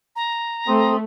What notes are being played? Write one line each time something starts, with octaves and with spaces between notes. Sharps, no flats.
A#5
A3 C4 C6 D#6